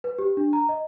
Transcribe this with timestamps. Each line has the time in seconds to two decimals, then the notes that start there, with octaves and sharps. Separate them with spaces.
0.04 B4
0.19 G4
0.37 D4
0.53 A#5
0.69 D#5